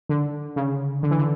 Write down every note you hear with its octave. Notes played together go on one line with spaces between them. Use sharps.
D3
C#3
D3
E3
D3